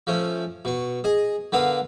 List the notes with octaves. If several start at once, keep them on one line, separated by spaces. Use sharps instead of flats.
F3 A3 C#4
B2 C#6
G#4 D#5
D3 B3 A#4 F5 D#6